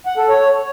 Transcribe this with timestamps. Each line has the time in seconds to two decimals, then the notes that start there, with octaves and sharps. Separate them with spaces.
0.06 F#5
0.18 A4
0.29 C#5